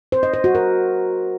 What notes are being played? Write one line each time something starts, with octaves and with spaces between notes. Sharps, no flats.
C5
D#5
C5
F#4
A#4